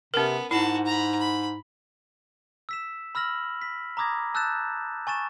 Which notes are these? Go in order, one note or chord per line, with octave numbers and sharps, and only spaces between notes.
C3 B3 C#4 A#4
G#2 E4 F#4 A5
A#5 B5
B5
E6 B6 E7
B5 E6 F6 A#6 F#7
B6
A#5 B5 D6 D#6 G#6 A#6
A5 E6 F#6 G6 A6 E7
G#5 C#6 A6 E7